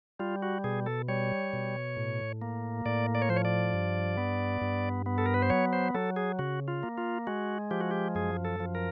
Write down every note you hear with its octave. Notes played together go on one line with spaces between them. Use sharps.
G3 F4
F#4
B2 G#4
A4
G3 C#5
B2
A2
A#3
A2 D5
D5
C#5
F3 C5
C#5
D5
G2
B3
G2
B3
A4
A#4
B4
C5
F#3 C#5
C5
F#3 A4
G#4
C#3 F#4
F4
A#3
F4
G#3 F#4
F3 G4
F#4
G4
F#2 G#4
A4
F3
A#4